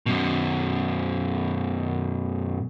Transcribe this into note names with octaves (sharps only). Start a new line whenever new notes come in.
F#2 B2